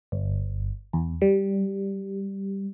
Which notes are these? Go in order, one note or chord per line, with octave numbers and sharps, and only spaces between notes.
G1
E2
G3